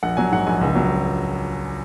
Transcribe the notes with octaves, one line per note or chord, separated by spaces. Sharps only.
A#1 F#5
F#3 G#5
G#2 F#5
A#1 G#5
C#2
F#3